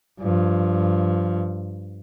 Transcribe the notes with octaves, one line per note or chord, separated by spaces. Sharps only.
G2 F3